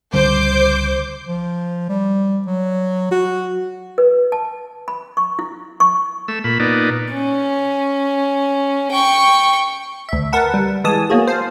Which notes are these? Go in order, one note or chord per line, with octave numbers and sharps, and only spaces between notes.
C#2 D3 G3 C5 D6 G6
F3
G3
F#3
F#4
B4
A5
B5
C#6
E4
C#6
A3 E6
A#2 B5
A#2 B3 D#4 D5
C#4
G5 C#6
D2 E5
A#4 B4 F#5 A5
G3
E3 G#3 G#5 A5 D#6
F#3 A#3 B3 F#4 G#4
C5 F5 A5